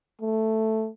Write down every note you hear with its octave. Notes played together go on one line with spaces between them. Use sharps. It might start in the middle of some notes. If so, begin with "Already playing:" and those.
A3